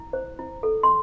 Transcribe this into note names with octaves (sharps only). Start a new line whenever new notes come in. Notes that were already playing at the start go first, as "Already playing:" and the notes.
Already playing: E4
C5
E4
A4
C6